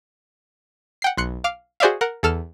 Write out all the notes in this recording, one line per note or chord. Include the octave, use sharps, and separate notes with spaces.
F#5 G5 C7
B1 C6 F#6 C#7
F5 D6 F6
F#4 G#4 C5 D5 E5 F5
A#4 F#5
E2 A4 F6 E7